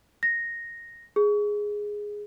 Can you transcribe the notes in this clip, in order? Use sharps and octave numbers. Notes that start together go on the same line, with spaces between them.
A#6
G#4